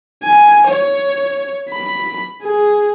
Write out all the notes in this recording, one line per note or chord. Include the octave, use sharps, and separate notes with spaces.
G#5
C#5
B5
G#4